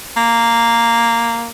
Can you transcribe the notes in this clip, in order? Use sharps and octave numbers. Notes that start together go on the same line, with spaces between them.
A#3